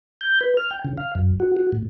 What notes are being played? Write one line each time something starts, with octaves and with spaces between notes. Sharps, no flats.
G6
B4
F6
G5
C#3
F5
F#2
F#4
F#4
A2